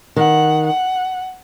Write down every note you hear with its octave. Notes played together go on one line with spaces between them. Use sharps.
D#3 F#5
F#5